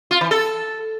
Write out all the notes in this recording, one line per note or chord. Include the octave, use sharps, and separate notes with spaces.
F4
E3
A4